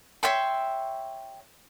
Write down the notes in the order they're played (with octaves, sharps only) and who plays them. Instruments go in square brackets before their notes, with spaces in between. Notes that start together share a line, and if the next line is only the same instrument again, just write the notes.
[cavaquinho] C#5 E5 G5 C6